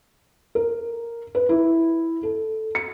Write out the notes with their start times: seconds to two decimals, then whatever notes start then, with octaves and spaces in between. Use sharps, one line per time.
0.55 A#4
1.35 B4
1.49 E4
2.23 A4
2.75 C#7